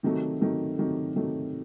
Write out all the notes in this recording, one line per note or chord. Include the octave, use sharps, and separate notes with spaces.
C3 D#3 F#3 A3
C3 D#3 F#3 A3
C3 D#3 F#3 A3
C3 D#3 F#3 A3